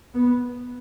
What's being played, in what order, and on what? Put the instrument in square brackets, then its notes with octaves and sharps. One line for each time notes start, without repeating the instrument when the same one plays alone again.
[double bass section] B3